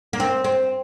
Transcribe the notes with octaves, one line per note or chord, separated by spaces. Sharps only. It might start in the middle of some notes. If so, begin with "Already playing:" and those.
A#3
C4
C4